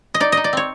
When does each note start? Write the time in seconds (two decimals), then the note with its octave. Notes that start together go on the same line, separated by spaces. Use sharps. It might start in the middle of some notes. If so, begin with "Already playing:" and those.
0.14 D#5
0.20 D#4 D5
0.32 D#4 D#5
0.44 D5
0.53 C4 C#5